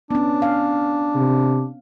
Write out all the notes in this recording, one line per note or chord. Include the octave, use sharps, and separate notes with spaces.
B3 C#4 D4
F5
C3